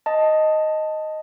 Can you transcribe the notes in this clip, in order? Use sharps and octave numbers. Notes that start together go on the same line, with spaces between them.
D#5 A5